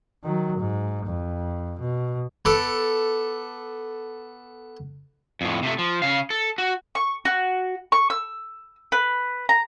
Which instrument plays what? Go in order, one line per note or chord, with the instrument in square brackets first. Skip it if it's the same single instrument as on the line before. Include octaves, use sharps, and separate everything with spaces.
[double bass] D#3 F#3
G#2
F2
B2
[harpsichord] B3 A4 A5 D6
[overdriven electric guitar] F2 A2
C3 A3
F3
C#3 F5
A4
F#4
[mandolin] C#6
F#4
C#6
E6
B4
A#5